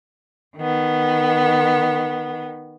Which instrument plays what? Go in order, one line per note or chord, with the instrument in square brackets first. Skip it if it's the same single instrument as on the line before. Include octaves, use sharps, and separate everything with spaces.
[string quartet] D#3 B3